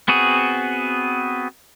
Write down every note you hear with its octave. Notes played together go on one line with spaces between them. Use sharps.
B3 C4 F#4 G#4